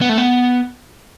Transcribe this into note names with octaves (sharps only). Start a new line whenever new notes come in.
B3
A3
B3